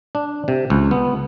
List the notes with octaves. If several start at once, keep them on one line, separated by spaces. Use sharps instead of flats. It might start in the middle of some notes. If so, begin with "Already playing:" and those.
D4
C3
C#2
B3